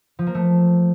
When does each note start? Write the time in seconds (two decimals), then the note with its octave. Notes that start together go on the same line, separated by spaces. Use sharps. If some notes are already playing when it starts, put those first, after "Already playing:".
0.19 F3
0.27 A#3
0.35 A3